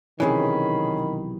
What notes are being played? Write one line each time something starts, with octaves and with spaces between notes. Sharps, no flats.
B1 C3 D#3 E3 C#4 G#4 B5